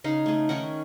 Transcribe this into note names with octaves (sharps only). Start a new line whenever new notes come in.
C#3 D#4 F5
A3 G#4
D#3 C#4 A#4 F#5